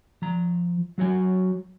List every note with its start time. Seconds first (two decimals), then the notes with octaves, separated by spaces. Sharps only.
0.22 F3 A#5
0.98 F#3 F#4 C#5 G#5